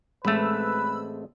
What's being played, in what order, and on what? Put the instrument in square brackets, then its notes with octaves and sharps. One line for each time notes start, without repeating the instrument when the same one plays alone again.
[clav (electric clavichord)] A1 A3 [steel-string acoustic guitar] G#3 C4 [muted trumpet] B4 [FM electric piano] B5 E6